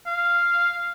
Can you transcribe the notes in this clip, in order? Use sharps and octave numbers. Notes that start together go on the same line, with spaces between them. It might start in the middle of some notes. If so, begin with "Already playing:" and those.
F5